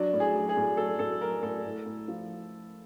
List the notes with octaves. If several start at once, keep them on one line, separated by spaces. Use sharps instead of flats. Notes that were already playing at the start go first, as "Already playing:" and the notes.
Already playing: F#3 D4
A2
G#4
F#3
G#4
A2
F#3 A4
A2 A4
F#3 A#4
A2 A4
A2
A2
F3